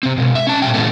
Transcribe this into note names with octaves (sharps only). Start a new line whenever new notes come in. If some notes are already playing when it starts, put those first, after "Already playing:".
C3 C4
B2 G#3
E5
C#4 A5
A#2 E3 G3 G5
A#2 C#3 E3 G#3 A3 B3